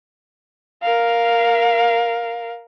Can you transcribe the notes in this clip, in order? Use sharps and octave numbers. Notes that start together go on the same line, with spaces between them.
A#4 F5